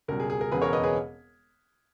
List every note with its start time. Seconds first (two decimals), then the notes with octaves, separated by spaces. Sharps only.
0.08 C#2 B2 G3 A#4
0.20 G#4
0.30 G#4
0.41 A#4
0.51 E1 E2 C#3 G#4 B4
0.62 A#4 C#5
0.73 B4 D#5
0.84 G#4 B4